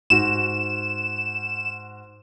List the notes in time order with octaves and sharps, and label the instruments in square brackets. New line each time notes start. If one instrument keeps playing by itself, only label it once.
[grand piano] G#2 F#4 [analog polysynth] E7